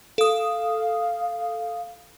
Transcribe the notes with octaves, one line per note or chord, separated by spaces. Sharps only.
A4 F5 D#6